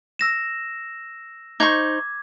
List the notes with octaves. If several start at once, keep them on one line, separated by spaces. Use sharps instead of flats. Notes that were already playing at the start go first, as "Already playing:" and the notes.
E6 A#6 E7
D#4 C5 C#6 D6 G#6